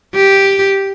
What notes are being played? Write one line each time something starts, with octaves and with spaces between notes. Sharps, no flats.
G4